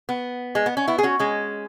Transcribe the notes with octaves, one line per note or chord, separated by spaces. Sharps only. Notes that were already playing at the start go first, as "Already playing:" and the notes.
B3
G#3
B3
C#4
B3 E4
G#4
C#4 F#4
G#3 C#4